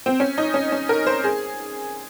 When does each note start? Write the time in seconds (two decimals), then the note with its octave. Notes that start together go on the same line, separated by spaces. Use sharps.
0.06 C4
0.20 C#4
0.38 D#4
0.54 C#4
0.72 C#4
0.89 A#4
1.07 C5
1.24 G#4